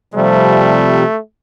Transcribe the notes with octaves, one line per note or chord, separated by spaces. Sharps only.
C3 F3 G3 A3